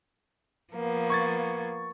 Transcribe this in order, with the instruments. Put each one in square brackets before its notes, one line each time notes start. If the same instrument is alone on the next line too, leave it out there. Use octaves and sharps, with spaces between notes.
[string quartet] F3 A#3 B3
[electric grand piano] C#6 G#6 A6